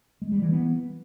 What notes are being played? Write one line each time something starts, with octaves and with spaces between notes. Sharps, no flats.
G#3
G3
E3
B3